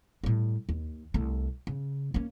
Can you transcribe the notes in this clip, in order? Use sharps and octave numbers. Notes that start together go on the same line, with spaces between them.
A2 G3
D#2
C2 A3
C#3
A#3 C#4